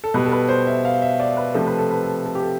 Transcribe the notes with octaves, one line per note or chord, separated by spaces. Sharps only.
A4
B2 G3 B4
A4
B4
C5
E5
F5
E5
D5
B4
C3 F3 A3 A4
B4
A4
B4
A4
A4
G4
A4